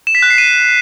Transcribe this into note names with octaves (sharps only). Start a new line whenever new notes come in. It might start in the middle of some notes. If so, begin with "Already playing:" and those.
E7
B6
F#6
C7
D#7